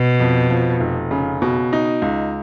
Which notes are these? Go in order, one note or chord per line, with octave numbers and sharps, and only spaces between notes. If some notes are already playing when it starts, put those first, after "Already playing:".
Already playing: B2
F2
F3
F1
C#3
B2
D#4
C#2